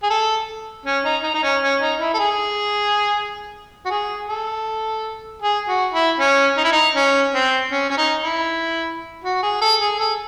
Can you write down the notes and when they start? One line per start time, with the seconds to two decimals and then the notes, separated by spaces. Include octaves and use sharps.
0.03 G#4
0.10 A4
0.86 C#4
1.05 D#4
1.24 D#4
1.34 D#4
1.43 C#4
1.62 C#4
1.81 D#4
2.01 E4
2.14 A4
2.19 G#4
3.85 F#4
3.90 G#4
4.29 A4
5.42 G#4
5.68 F#4
5.93 E4
6.19 C#4
6.57 D#4
6.64 E4
6.72 D#4
6.95 C#4
7.34 C4
7.71 C#4
7.90 C#4
7.97 D#4
8.22 E4
9.24 F#4
9.43 G#4
9.61 A4
9.81 G#4
9.99 A4